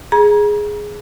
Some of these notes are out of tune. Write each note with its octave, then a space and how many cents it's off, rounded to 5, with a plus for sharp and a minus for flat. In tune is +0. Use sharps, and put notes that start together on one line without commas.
G#4 +0 A#5 +40